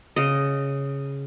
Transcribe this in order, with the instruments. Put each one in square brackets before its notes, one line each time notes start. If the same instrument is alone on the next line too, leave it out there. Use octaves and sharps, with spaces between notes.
[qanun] C#3 D#5